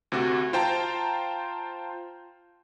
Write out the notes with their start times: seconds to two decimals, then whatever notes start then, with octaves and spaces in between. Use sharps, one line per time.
0.12 D2 C3 F#4 D6
0.53 F4 C5 G5 A5 A#5